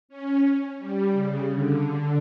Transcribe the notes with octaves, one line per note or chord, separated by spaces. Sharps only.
C#4
G3
C#3
D3
D3